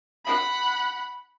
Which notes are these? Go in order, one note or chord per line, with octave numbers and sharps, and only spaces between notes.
F#5 B5